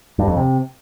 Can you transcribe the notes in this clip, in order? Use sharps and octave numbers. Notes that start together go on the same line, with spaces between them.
G2
F2
C3